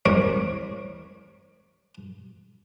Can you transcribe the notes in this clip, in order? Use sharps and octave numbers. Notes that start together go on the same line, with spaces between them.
C2 C4 A#4 C#5 C#6 D6